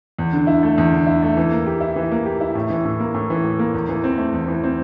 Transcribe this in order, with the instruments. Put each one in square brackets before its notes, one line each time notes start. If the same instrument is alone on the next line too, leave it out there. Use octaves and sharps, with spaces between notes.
[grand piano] E2
D3
E4
A3
E2
D3
E4
A3
E3
A#3
G4
E4
E3
A#3
G4
E4
A2
E3
A2
A#3
A2
E3
A2
A#3
E2
E3
C4
A3
E2
E3
C4